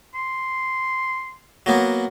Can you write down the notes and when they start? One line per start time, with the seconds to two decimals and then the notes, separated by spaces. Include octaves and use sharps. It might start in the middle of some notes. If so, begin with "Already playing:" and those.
0.15 C6
1.66 F#3 A#3 B3